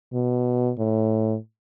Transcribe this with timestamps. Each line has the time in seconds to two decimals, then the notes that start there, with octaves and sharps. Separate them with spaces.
0.13 B2
0.78 A2